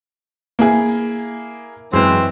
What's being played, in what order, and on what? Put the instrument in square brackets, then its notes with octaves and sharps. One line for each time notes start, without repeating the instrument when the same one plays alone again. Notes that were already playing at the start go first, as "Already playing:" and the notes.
[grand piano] A#3 E4 G#4
[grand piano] F#2 G#3 [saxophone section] E3 C4